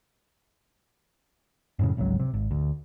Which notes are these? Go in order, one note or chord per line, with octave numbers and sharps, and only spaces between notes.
F#2 A2 C#3
G#1 C#2 G#2 F#3
C3
G#1
D2